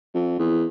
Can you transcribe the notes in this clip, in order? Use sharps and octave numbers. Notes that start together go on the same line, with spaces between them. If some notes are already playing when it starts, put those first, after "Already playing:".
F2
E2